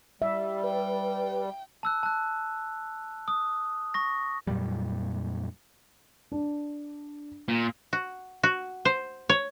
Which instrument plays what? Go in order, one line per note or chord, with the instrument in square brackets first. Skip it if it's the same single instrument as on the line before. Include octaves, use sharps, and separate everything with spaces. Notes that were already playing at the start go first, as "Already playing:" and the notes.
[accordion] G3 [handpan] E5
[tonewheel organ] B4 [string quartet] G5
[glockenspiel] A5 E6 F#6
A5 F#6
D#6
C#6 A#6
[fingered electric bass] F2 A#2 F#3 G3
[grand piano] D4
[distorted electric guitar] A#2
[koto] F#4
F#4
C5
C#5